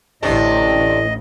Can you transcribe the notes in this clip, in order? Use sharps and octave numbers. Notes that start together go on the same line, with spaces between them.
A1 D2 A2 C3 A3 D4 D#5